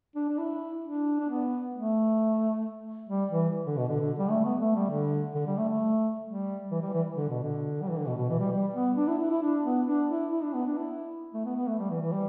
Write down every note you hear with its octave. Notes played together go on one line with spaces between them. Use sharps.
D4
D4
E4
D4
D4
B3
A3
G3
E3
D3
B2
D3
D3
G3
A3
B3
A3
G3
D3
D3
G3
A3
A3
G3
E3
G3
E3
D3
B2
D3
G3
E3
D3
B2
B2
E3
G3
G3
B3
D4
E4
E4
E4
D4
B3
D4
E4
E4
D4
B3
D4
E4
A3
B3
B3
A3
G3
E3
E3
G3